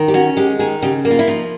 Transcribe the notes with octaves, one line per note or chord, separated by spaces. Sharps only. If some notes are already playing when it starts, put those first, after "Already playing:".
Already playing: D#3
G4
C#4 F#4
G#3 G4
D#3 G#4
C#3 G4
A#3
F4
E4
F3 D#4